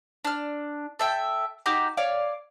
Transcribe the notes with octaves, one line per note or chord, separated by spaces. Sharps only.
D4 F6
A4 E5 G5
D#4 F#4 G4 D6
C#5 D5 F5